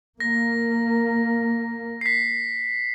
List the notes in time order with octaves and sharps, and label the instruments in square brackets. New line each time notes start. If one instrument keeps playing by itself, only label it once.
[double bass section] A#3 [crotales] A#6
[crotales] B6 C7